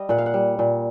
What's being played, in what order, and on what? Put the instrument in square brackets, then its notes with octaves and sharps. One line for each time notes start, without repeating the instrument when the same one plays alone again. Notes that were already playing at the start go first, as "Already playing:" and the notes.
Already playing: [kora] G3 D#5
A#2 F#5
F5
F#5
G3
A#2